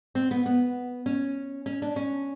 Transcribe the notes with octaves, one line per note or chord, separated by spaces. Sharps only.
C4
B3
B3
C#4
C#4
D4
C#4